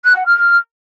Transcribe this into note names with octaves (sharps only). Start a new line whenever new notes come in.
F#6
F#5
F6